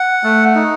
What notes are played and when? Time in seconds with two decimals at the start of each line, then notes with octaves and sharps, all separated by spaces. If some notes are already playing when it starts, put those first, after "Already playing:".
Already playing: F#5
0.24 A3
0.55 D#4